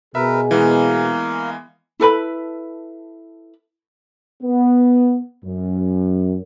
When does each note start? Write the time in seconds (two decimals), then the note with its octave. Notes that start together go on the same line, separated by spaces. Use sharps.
0.15 B2 G#4 A#4 B4 E5
0.51 E3 G#3 A#3 B3 F5
2.00 E4 A4 B4 B5
4.43 B3
5.45 F#2